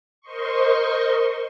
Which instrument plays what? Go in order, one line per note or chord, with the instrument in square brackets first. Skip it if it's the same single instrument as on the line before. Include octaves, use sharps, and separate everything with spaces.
[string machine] A#4 C5 D#5 C6 C#6